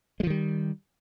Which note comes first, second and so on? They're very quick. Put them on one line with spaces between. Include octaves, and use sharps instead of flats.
G#3 F3 D#3 G3